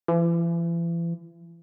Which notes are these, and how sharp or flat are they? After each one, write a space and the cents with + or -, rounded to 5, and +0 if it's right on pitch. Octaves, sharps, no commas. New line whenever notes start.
E3 +40